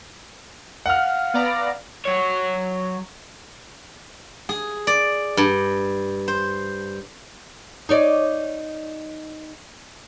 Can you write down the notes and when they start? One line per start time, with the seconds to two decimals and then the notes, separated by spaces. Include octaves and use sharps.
0.86 F5 F#5 F6
1.34 B3 D5 A#5
2.05 F#3 C#5
4.49 G#4
4.87 D5
5.37 G2
6.28 C5
7.89 D#4 C#5 D5